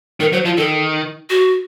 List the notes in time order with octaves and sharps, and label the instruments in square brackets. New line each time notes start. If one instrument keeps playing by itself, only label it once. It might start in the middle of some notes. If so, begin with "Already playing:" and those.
[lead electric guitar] D#3 [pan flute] A#4
[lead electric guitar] F#3 [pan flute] C5
[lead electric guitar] F3 [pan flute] F4
[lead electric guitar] D#3 [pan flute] A4
[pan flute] F#4